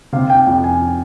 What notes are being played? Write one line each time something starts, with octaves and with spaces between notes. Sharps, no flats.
C3 F5
G5
F2 G5
G#5